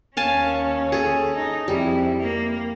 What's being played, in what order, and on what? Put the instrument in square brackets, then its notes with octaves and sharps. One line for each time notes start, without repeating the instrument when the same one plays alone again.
[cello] D#2 C#4 [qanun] F5 G#5 A5
[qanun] G#4 A4
[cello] D#4
[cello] F2 E4 [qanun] G3
[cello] A#3